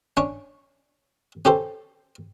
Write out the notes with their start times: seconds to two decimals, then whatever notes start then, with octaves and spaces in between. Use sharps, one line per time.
0.17 C#4 D4 C#5
1.45 C#4 G4 A4 C5